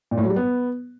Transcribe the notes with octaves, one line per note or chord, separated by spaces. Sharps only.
A#2
A2
F#3
G3
B3